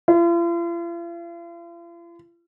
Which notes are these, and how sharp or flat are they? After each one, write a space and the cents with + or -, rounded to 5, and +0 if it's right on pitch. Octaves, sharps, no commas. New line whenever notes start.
F4 -45